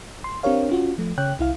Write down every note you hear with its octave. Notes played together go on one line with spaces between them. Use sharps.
C6
C4 D4 G4 A#4 C#5 F5
C#4 F4 F#4
F3 A3
C#3 C#5 G5 F#6
C2 E4 F5